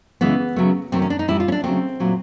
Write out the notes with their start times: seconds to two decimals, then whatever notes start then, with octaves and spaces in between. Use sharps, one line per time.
0.21 C#3 E3 G#3 B3
0.56 C#3 F#3 A3
0.92 C3 D#3 F#3 A3 C4
1.02 C#4
1.10 D4
1.19 D#4
1.28 A2 E3 G3 E4
1.40 F4
1.48 C#4
1.52 D4
1.64 C#3 F#3 A3 C4
2.00 A#2 F#3 A3